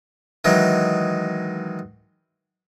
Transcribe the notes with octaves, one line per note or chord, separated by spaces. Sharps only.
D#3 E3 F#3 G#3